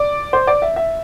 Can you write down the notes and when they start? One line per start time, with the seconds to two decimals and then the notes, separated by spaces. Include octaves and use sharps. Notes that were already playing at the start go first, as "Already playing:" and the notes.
Already playing: D5
0.33 C5
0.47 D5
0.62 E5
0.76 E5